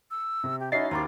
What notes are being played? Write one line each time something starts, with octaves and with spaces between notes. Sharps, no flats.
E6
C3
G4
F#3 C#4 D#4 E4 E5 A6 C7
D#2 C5 A#5 B5 D6